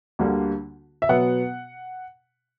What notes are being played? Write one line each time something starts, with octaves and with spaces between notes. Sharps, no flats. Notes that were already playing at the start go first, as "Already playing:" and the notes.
D2 D3 G3 A#3
E5
B2 F#3 B3 F#5